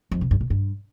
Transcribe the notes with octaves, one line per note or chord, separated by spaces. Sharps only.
F2
C3
G2
B2
G2